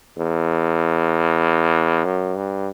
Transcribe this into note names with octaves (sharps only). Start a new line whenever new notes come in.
E2
F#2
G2